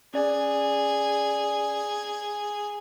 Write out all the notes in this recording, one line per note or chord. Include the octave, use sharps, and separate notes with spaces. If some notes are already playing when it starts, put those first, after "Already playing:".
C#4 G#4 D5